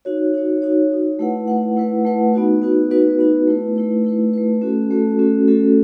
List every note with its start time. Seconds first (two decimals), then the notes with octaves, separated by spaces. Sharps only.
0.05 D#4 F#4 C#5
0.34 D#4 F#4 C#5
0.62 D#4 F#4 C#5
0.91 D#4 F#4 C#5
1.19 A3 E4 B4 F#5
1.48 A3 E4 B4 F#5
1.76 A3 E4 B4 F#5
2.05 A3 E4 B4 F#5
2.34 B3 D#4 F#4 B4
2.62 B3 D#4 F#4 B4
2.91 B3 D#4 F#4 B4
3.19 B3 D#4 F#4 B4
3.47 A3 E4 B4
3.76 A3 E4 B4
4.05 A3 E4 B4
4.33 A3 E4 B4
4.61 A3 C#4 F#4 A4
4.91 A3 C#4 F#4 A4
5.19 A3 C#4 F#4 A4
5.48 A3 C#4 F#4 A4